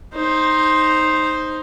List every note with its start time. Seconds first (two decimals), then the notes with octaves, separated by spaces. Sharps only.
0.13 D#4 C5